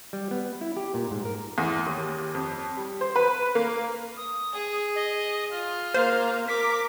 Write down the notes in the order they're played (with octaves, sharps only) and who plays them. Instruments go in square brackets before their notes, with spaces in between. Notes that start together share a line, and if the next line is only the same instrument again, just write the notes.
[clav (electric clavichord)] G3
B3
E4
G4
A#2
G#2
A#4
[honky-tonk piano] E2
D#2
F2
G3
C5
B4
A#3
[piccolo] D#6
[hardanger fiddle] G#4
[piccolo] D#5
[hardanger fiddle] F4 [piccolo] F6
[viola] A#3 F5 [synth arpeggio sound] C5
[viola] A#4 D6 [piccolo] B6